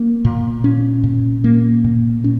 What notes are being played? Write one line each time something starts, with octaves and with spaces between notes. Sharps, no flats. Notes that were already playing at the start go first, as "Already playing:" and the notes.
Already playing: A#3
A#2
C#4
A#2
A#3
A#2
C#4